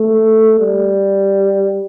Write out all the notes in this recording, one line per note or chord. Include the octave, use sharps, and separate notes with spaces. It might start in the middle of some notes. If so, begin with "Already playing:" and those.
Already playing: A3
G3